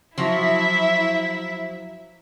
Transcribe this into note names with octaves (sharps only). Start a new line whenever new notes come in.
F3 F#3 E4 E5